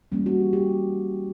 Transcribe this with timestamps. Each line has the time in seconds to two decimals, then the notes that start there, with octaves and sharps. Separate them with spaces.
0.12 E3 G3 A#3 C#4
0.26 F#4
0.40 G4
0.53 G4